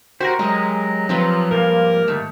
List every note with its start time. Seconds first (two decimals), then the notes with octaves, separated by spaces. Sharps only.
0.20 F#4 G4 A#4 C5
0.39 F#3 G#3 D#5
1.09 F3 C4 F4 B4
1.51 G#2 G3 A#3 A#4
2.08 D#3 A3